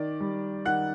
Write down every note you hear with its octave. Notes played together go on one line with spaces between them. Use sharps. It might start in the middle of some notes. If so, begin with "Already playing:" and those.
Already playing: D#3 D5
G3
D#3 F#5 F#6